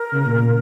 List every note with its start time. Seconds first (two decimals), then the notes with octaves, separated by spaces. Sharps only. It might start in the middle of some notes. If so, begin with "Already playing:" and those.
Already playing: A#4
0.12 C#3
0.26 A#2
0.40 A#2